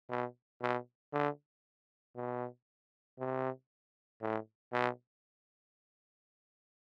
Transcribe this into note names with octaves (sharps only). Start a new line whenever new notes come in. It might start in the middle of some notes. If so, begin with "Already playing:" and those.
B2
B2
D3
B2
C3
A2
B2